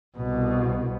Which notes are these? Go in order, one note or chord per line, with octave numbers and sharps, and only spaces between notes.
C2 B2